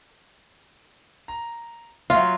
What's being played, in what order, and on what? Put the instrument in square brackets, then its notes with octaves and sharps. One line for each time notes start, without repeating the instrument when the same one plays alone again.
[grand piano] A#5
[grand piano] F#3 C6 [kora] F4